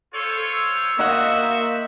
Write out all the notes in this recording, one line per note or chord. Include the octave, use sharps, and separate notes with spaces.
F4 A4 C5 C#5
E6
A#3 C4 D#4 F#4 E5 F#5